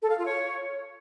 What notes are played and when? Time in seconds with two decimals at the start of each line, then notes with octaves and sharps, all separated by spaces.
0.01 A4
0.09 F5
0.17 F4
0.25 C#5